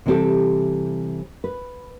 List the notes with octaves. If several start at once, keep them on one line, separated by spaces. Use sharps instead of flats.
C3 E3 G3 C4 G4 A4
B4